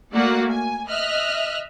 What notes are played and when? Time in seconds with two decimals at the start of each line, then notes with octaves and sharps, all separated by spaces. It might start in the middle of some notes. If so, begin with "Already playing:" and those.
0.12 A3 A#3 F#4 D5 F#5
0.52 G#5
0.88 D#5 E5 F6 F#6